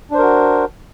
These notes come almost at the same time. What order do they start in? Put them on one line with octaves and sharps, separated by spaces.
D4 C5 A#4 F#4